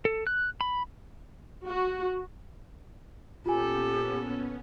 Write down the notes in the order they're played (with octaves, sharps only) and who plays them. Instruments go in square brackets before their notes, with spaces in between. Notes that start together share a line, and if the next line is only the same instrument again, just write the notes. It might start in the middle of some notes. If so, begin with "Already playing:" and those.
[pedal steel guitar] A4
F#6
B5
[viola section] F#4
[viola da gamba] A#2 A4 [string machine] B3 C#4 [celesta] F4 G#5 [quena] G4